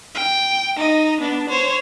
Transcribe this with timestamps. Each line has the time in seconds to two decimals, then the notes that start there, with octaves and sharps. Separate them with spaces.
0.15 G5
0.76 D#4 D#5
1.20 B3 D4
1.49 C5 C#5